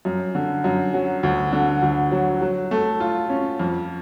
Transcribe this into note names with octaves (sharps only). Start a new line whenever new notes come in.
F#2
D3
F#2
F#3
D2
D3
D2
F#3
F#3
A3
F4
C#4
F2